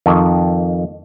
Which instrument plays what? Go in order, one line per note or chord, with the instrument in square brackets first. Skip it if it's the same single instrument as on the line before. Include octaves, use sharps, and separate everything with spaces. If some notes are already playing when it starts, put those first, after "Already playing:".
[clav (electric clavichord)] F2 D#3